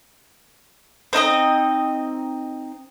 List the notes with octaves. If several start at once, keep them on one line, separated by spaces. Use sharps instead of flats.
C4 D#4 A#4 D#5